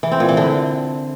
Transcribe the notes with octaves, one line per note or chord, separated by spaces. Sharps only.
E3
C4
A#2
E3
D3